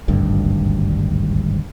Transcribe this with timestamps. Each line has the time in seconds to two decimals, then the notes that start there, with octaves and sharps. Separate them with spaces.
0.08 D#1 G#1 D2 G2